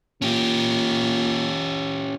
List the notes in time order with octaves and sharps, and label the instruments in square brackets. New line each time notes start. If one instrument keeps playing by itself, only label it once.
[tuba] A#2 [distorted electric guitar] C#4 G4